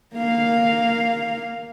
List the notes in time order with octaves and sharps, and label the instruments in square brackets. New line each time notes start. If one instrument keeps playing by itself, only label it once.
[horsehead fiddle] A#3 F5